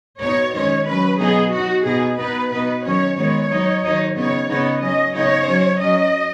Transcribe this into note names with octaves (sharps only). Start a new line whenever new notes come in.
B2 B3 D#4 C#5
D#3 G#3 C#4 C#5
F#3 C#4 B4
B2 F#3 B3 D#4 G#4
F#3 D#4 F#4
B2 B3 D#4 G#4
B2 B3 D#4 B4
B2 B3 D#4 B4
D#3 F#3 C#4 C#5
D#3 G#3 B3 C#5
F#3 D#4
D#3 F#3 D#4
C#3 B3 D#4 C#5
C#3 B3 D#4 C#5
F#3 C#4 D#5
C#3 B3 D#4 C#5
F#3 C#4
F#3 C#4 D#5